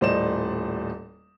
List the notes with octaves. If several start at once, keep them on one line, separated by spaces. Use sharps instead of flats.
D#1 A2 C5 D5 D#5 E7